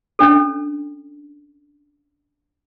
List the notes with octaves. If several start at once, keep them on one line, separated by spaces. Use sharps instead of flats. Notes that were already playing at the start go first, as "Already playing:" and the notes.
C#4 D4 A4